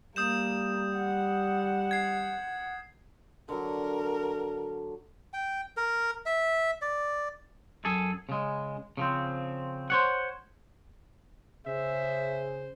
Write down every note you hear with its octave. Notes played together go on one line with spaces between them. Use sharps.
G3 A#3 D#6 G6 E7
F#5
G#6 C7
D3 F#3 A#4
G5
A#4
E5
D5
F#2 G#4 A4
C#3 G#3
C#3 F3 C4
C5 C#5 F#5
C#3 G#4 C5 E5